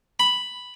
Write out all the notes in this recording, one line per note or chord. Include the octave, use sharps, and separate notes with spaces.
B5